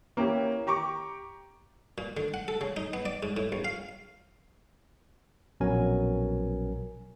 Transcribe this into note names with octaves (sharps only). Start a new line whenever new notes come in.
A#3 C#4 E4 G4
G4 A#5 C#6 D6
A#2
D3
F#5
A4
C#3
D#4
B3
D5
G#2
A2
A#1
F5
A#1 B2 F#3 C#4 A#4 G#5